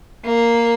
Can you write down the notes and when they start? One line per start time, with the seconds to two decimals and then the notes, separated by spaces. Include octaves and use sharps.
0.24 A#3